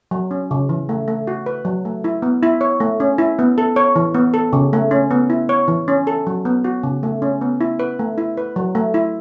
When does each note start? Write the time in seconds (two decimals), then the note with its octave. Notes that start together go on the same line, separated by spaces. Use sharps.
0.11 F#3
0.31 C#4
0.51 C#3
0.69 E3
0.89 A3
1.08 A3
1.27 F#4
1.46 B4
1.65 F#3
1.85 A3
2.04 E4
2.22 B3
2.43 E4
2.61 C#5
2.80 A3
3.00 C#4
3.18 E4
3.39 B3
3.58 A4
3.76 C#5
3.96 E3
4.15 B3
4.34 A4
4.53 C#3
4.73 A3
4.91 C#4
5.11 B3
5.30 E4
5.49 C#5
5.68 E3
5.88 C#4
6.07 A4
6.27 F#3
6.45 B3
6.64 F#4
6.83 C#3
7.03 A3
7.22 C#4
7.41 B3
7.61 E4
7.79 B4
7.99 A3
8.18 E4
8.37 B4
8.56 F#3
8.75 A3
8.94 E4